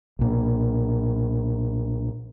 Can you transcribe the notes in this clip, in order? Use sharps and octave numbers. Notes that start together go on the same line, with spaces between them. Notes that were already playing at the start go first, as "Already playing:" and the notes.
B1 A#2